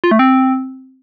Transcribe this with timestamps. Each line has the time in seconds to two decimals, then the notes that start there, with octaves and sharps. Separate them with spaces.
0.04 F4
0.11 A3
0.19 C4